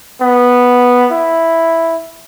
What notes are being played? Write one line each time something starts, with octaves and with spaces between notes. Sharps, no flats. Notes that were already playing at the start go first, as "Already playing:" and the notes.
B3
E4